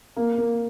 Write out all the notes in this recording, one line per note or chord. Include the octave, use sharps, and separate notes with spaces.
A#3
A#3